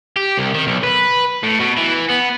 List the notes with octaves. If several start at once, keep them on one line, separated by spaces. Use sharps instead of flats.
G4
C2
D#3
B1
B4
A2
B2
E3
B3